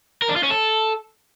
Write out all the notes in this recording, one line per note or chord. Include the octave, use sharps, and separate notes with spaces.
A#4
D4
F4
C#4
A4